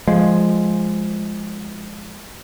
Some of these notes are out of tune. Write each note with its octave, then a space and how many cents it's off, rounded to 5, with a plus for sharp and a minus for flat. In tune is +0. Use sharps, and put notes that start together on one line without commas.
F3 +0 G#3 +0